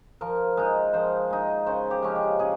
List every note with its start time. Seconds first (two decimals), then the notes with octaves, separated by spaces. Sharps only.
0.21 F3 A#4
0.57 G#3 D#4
0.93 F3 C5
1.30 G#3 D#4
1.66 C#3 C5
1.91 G4
2.02 F3 G#3 C#4
2.16 G4
2.39 C#3 G#4